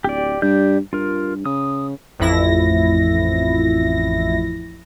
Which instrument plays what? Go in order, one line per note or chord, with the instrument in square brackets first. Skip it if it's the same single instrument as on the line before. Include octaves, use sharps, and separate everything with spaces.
[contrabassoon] D1 [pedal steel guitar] G4 D5
[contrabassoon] G2 [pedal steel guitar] G4 D5 G6
[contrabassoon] G2 [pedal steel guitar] F4 A#4
[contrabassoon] C#3 [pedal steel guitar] D#6
[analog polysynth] A1 F2 E4 A#6